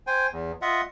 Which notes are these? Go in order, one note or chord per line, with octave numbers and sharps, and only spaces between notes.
C5 G5 G#5
E2
F4 D#5 E5 F#5